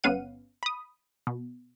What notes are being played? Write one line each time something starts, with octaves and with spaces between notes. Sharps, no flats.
G1 B3 C#4 F5 F#5 D#7
B5 D#6
B2